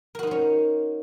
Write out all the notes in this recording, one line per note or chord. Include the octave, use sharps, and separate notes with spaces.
C#4 D#4 F#4 A#4 C5